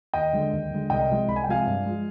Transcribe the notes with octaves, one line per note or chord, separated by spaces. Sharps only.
D#2 D#5 G5
D3 G#3
D#2
D3 G#3
C2 D#5 G5
C3 F3 G#3
C2 B5
G#5
G5
C3 F3 G#3 F5 G#5
G2
F3 G#3